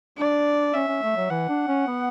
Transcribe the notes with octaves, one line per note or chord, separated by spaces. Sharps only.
D4 D5
C#4 E5
C#4
A3
F#3
E3 F#5
D4
C#4
B3